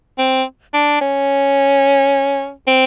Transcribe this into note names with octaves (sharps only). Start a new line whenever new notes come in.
C4
D4
C#4
C4